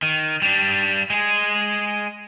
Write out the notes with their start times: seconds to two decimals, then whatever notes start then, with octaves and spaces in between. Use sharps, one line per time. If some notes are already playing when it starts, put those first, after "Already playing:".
0.03 D#3
0.42 G3 D4
1.10 G#3 G#4